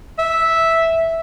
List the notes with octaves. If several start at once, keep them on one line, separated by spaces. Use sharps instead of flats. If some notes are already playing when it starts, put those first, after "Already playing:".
E5